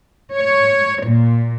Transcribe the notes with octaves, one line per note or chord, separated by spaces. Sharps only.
C#5
A#2